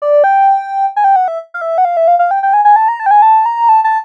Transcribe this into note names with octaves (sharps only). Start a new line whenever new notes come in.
D5
G5
G#5
G5
F#5
E5
F5
E5
F#5
F5
E5
F5
F5
G5
G5
G#5
G#5
A5
A#5
A5
G5
G#5
A5
A#5
A5
A5